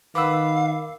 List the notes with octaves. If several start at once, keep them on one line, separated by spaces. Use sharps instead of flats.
D#3 B4 F5 F#5 B5 D6 E6